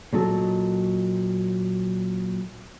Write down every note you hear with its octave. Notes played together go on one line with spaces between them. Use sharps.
A#2 F#3 D#4 A4